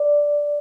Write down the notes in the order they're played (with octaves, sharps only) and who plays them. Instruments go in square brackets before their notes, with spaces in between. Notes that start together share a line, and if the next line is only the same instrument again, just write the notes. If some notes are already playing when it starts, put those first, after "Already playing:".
Already playing: [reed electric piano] D5